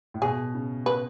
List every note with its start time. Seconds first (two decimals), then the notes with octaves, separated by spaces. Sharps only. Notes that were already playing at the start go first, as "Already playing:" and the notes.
0.14 A2
0.22 B2 G#4
0.54 C#3
0.86 B4